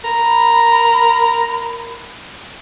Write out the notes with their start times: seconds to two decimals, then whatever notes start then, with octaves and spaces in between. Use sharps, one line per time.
0.05 A#4 B5